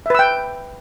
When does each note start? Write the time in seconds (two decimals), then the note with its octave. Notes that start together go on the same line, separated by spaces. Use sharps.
0.06 E5
0.10 B4
0.15 E6
0.19 G5